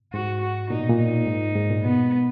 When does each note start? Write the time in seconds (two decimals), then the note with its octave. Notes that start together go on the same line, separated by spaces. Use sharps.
0.13 G#2 F#4
0.42 F#4
0.70 A#2 D#4
0.80 B2
0.90 A#2
0.99 D#4
1.27 G#2
1.56 G#2
1.70 A#2
1.84 B2 B3